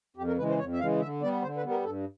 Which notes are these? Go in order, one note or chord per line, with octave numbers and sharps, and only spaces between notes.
F2 G4
A#4
C#3 E3 G#3 B4
C5
F2 C#5
E5
C#3 E3 G#3 F5
D3 E5
G3 B3 D5
D3 C5
B4
G3 B3
A#4
G2 A4